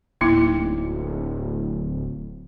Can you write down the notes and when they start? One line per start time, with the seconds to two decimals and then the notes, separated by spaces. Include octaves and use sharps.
0.21 D1 A#3 D#4 E4